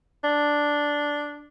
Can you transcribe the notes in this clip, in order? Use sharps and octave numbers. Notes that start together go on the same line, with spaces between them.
D4